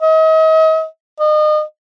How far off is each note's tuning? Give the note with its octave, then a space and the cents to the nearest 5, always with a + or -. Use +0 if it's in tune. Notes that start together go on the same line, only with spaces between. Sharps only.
D#5 +40
D#5 -35